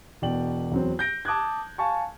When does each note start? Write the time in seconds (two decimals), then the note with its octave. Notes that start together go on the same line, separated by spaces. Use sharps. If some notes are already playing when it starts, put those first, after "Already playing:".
0.22 E1 B2 D5 G5 F#7
0.71 E2 F#3 C4
0.99 G6 A#6 D7
1.25 A5 D6 D#6 F#6 G#6
1.78 F5 G#5 A5 C#6